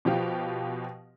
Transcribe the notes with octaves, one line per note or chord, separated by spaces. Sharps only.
B2 F3 G4 F5